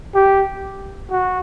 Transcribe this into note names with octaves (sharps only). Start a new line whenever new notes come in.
G4
F#4